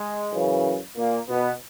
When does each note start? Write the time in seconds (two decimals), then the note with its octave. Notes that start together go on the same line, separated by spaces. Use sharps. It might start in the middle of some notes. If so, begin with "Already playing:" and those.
Already playing: G#3
0.32 F#2 C#3 E3
0.97 A#2 A#3
1.28 B2 B3